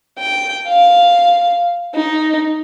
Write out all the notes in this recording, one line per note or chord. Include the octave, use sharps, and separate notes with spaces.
G5
F5
D#4